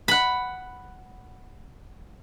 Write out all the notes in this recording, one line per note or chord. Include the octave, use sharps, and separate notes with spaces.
F#5 B5